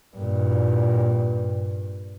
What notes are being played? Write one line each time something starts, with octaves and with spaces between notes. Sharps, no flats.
G2 A#2